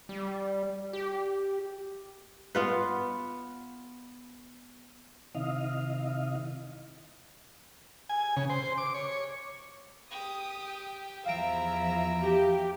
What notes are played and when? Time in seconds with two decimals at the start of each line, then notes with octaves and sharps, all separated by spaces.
0.09 G3
0.93 G4
2.55 B3 F4 B4
5.35 C3 D#3 E4 D#5 F5
8.09 G#5
8.36 C#3
8.50 C5
8.78 D6
8.94 C#5
10.11 G4 D#6
11.25 E2 F3 E4 E5 F5 A#5 D7
12.23 G4